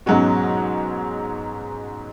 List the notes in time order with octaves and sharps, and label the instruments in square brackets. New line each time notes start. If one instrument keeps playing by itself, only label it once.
[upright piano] G#2 B2 F#3 G#3 C#4 F#4